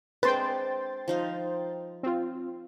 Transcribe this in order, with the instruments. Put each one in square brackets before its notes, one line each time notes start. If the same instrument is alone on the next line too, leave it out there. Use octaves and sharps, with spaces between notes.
[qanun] G#3 C4 D4 [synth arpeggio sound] B4 [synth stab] G5 C6 A6
[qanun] F3 D#4 F5
[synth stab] C4 F4